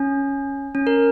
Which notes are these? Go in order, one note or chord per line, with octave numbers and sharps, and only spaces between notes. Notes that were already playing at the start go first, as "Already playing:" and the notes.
Already playing: C#4
C#4
A#4